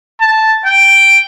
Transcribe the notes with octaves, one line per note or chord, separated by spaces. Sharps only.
A5
G5